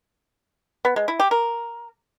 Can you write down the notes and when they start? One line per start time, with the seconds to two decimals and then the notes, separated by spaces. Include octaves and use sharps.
0.85 B3
0.96 G#3
1.08 E4
1.20 G4
1.31 A#4